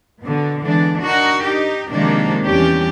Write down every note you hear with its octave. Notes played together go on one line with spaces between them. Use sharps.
B2 D3
D3 E3 G#3 B3 D4
D4 D#4 F#4 A#4
D#4 G4
C3 D#3 F3 G#3 A#3 D4
E2 E3 G3 C#4 D4 G4